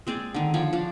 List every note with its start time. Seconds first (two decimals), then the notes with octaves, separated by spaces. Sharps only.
0.07 G#3 C4 G#4 D5
0.34 D3 D#3
0.54 F3 C#5 D5
0.73 F3 D4